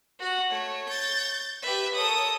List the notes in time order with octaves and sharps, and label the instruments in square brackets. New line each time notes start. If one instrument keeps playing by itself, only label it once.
[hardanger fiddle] F#4 F#5
[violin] A3 [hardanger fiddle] C#5
[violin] G6 A6
[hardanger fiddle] G4 B4 [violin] E5
[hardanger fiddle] A4 D#6 [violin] A#4 C#5